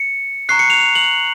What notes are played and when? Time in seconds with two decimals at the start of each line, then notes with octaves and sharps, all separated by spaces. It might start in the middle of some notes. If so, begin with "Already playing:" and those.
Already playing: C#7
0.49 A#5 C#6 F#6 C7
0.59 C#7
0.70 F7
0.80 F7
0.95 F#7